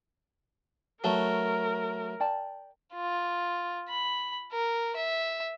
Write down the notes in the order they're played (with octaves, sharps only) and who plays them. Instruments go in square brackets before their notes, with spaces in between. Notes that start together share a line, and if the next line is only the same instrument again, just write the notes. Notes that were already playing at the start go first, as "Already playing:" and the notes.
[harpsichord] F#3 A3 [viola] A#4 [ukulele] B4 A5 A#5
[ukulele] D5 G5 A5
[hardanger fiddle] F4
B5
A#4
E5